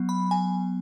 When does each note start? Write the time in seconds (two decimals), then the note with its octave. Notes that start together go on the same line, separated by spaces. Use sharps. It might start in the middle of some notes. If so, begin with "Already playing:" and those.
Already playing: F#3 B3
0.09 B5
0.31 G#5